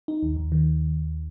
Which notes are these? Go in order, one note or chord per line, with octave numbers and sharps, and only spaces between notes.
D#4
D#2
D#2
D#3